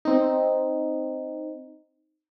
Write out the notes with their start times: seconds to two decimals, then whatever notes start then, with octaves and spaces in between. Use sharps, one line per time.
0.05 C4 D#4